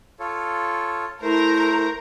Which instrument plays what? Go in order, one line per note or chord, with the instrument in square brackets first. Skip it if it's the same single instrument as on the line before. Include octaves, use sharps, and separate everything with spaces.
[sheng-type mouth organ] F4 A4 C#5
[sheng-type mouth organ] A3 C5 [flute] E4 [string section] A#4 A#5